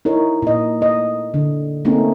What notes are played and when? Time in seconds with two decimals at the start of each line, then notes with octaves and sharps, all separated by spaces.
0.05 D#4 E4 A#4 C#5
0.42 A#2 D#5
0.81 A3 D#5
1.34 D3
1.85 A3 A#3 C4 C#4 D#4